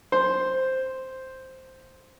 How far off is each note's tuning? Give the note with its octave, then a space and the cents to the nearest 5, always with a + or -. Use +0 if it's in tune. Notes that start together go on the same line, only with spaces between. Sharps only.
C5 +0